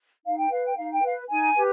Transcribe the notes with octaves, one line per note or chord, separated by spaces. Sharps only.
D#4 F5
G5
B4 F5
G5
D#4 F5
G5
B4 F5
D#4 G#5
G4 B4